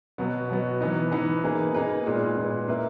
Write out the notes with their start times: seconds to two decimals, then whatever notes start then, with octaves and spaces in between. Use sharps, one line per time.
0.18 B2 F#3 B3
0.50 B2 F#3 B3
0.81 E3 B3 D#4
1.11 E3 B3 D#4
1.44 A#3 D#4 G#4 B4
1.74 A#3 D#4 G#4 B4
2.06 A#2 G#3 B3
2.37 A#2 G#3 B3
2.68 A#3 E4 B4